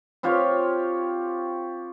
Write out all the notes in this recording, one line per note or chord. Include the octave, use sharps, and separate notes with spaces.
C4 F4 G4 C#5